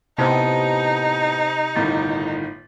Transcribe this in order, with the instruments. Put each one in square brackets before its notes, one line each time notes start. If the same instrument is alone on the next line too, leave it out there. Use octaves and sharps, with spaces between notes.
[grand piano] A2 B3 [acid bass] C3 [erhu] D#4 [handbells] C5 A5
[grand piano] G1 A2 D#3 [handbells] A6